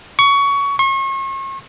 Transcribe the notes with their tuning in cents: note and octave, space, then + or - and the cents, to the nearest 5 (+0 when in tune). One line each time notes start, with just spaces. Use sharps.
C#6 +20
C#6 -40